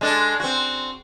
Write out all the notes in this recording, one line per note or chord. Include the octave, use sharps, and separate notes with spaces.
G#3 D4 A4
C4 F#4